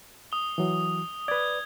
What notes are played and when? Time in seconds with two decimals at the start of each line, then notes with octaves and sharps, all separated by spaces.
0.32 D#6 G7
0.58 E3 F#3
1.28 B4 D5 G#6